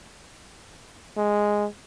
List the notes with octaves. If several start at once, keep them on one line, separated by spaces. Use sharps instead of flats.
G#3